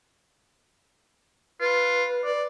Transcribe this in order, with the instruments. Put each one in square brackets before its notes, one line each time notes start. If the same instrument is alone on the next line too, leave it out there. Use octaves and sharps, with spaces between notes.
[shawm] F4 [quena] B4
[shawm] D5